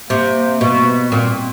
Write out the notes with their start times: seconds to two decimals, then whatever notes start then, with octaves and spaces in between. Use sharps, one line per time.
0.10 C3 A#3
0.61 B2
1.12 A#2 C4